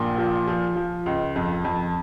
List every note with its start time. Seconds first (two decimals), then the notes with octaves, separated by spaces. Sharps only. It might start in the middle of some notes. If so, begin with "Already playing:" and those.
Already playing: A#1 A#2
0.18 F3
0.47 F3
0.76 F3
1.06 C#2
1.36 F2
1.64 F2